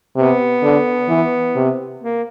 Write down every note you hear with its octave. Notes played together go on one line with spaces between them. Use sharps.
C3 B3
D3
E3
C3
A#3